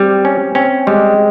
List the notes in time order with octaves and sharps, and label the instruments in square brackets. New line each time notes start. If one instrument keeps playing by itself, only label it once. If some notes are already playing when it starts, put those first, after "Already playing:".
Already playing: [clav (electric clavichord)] G3 [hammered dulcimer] C4
[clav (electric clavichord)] C#4
[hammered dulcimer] C4 [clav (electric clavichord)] C#4
[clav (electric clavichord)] G3 [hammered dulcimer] G#3